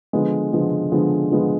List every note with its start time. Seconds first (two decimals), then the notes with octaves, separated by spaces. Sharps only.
0.13 D3 F3 G#3 B3
0.53 D3 F3 G#3 B3
0.92 D3 F3 G#3 B3
1.32 D3 F3 G#3 B3